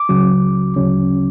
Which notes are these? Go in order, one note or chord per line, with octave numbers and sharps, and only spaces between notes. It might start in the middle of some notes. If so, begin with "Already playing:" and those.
Already playing: D6
C#2 C#3 F#3
D2 C#3 F#3 C#4